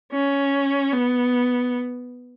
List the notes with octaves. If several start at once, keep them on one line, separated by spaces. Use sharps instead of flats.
C#4
B3